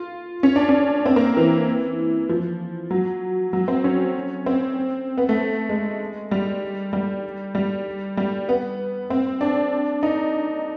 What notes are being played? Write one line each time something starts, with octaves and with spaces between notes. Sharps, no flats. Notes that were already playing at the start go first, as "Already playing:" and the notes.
Already playing: F4
C#4
D4
C#4
C4
A#3
E3
F3
F#3
F#3
C4
C#4
C4
B3
A3
G#3
G3
G3
G3
G3
B3
C4
D4
D#4